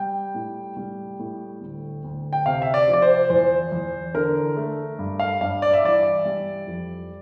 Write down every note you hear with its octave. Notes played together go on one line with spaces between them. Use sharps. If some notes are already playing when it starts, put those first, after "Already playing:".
Already playing: G3 G5
A2
G3
A2
D2
D2
G5
C3 F5
E5
D5
F3
D5
C5
E2 C5
E2
D3 A#4
A3
G2
F5
G2 F5
D5
E5
E3 D5
G3
F2